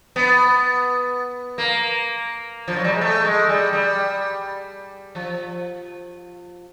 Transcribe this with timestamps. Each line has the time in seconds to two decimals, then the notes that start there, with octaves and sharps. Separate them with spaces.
0.16 B3
1.58 A#3
2.68 F3
2.76 F#3
2.84 G3
2.92 G#3
3.01 A3
3.25 G#3
3.49 G3
3.73 G3
5.15 F3